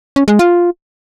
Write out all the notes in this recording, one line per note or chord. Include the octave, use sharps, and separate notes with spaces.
C#4
G#3
F4